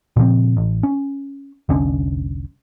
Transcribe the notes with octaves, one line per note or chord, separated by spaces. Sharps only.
A#2 C#3 F3 C4
A1
C#4
F1 C2 D3 C#4